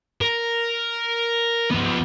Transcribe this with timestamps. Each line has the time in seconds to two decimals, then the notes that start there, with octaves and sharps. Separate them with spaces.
0.21 A#4
1.71 F3 B3